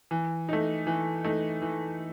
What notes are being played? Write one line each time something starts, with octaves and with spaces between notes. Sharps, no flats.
E3
A3 D#4
E3
A3 D#4
E3